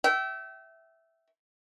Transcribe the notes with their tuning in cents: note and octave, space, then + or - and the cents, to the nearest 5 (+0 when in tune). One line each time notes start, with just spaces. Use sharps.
E5 +0 G5 -35